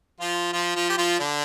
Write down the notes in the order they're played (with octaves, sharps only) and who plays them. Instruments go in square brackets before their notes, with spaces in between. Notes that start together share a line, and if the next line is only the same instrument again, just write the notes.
[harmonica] F3 F4
F3 F4
F3 F4
G4
F3 F4
D3 D4